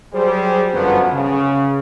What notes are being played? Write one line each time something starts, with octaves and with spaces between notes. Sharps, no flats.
F#3 G3 G#4 C5
G1 F#2 F3 F#3 B3
C#3